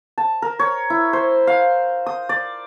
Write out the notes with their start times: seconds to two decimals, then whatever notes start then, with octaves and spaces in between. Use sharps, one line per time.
0.18 A5
0.42 A#4
0.59 C#5
0.90 E4
1.13 C5
1.47 F5
2.06 D#6
2.29 D5